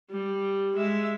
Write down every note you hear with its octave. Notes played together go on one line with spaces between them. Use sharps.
G3
G#3 E5